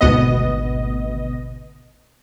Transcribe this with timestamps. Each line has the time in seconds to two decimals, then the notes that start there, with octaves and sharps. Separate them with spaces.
0.01 G#1 D2 B2 B3 D#5